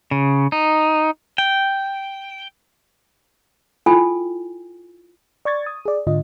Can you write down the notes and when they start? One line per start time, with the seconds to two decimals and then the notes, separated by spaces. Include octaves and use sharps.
0.11 C#3
0.52 D#4
1.38 G5
3.86 E4 F4 A4 G5 G#5
5.45 D5 C#6 G#6 A6
5.66 D#6
5.86 G#4 D5
6.07 G#2 D3 F4 D#5